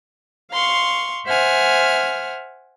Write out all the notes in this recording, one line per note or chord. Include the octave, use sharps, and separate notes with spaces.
F5 C6 C#6
C5 E5 F#5 G#5 F6